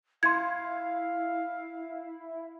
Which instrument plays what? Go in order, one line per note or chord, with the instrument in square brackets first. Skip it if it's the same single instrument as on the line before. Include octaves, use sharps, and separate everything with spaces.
[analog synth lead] E4 [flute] F5 [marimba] C6 G#6